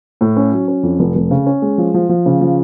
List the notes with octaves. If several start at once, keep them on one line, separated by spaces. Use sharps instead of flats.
A2
C#4
F#3
C#4
F2
F1
F1
C#3
C#4
G#3
F3
F3
F3
C#3
F3